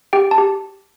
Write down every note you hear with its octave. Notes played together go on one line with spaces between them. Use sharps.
G4 G5
A5
G4